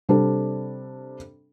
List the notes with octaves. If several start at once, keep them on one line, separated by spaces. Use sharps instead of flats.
C3 G3 D4 A4